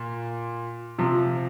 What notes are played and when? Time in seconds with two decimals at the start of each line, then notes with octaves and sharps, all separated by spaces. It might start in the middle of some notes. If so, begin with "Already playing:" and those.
Already playing: A#2
0.99 C3 F3